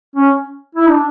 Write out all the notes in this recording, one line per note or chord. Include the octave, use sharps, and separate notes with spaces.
C#4
E4
D4